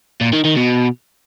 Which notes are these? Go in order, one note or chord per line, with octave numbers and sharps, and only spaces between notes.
A#2
D#3
D#3
B2